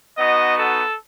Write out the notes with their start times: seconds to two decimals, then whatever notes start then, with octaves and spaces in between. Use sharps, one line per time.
0.17 B3 D#4 F#4 D#5
0.58 A4